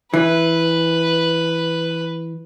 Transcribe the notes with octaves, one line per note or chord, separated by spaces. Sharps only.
E3 B4